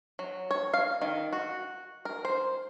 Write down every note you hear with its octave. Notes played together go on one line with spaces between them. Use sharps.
F#3
C#5
F5
D#3
F#4
A#4
C5